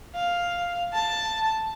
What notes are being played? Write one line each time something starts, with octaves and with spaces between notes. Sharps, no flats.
F5
A5